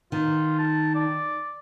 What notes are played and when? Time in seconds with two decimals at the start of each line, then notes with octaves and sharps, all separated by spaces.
0.12 D#3 F4
0.59 A5
0.95 D5